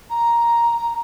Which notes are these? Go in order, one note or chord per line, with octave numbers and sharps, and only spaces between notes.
A#5